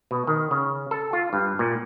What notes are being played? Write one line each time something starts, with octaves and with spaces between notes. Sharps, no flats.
B2
D#3
C#3
A4
F4
G2
A#2